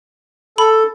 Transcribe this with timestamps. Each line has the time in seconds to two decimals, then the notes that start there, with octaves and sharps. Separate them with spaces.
0.58 A4 B5